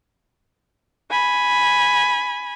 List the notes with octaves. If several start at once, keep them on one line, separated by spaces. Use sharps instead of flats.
G#5 B5